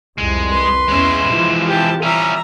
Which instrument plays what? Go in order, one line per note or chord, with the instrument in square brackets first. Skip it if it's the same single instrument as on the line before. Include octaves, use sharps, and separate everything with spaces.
[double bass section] C2 F2 [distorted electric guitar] G#3
[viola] B4 C6
[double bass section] E2 C#4 [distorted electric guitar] G#3 E4
[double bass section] C3 E3 F3
[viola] G4 A5
[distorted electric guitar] G3 C#4 [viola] E5 A#5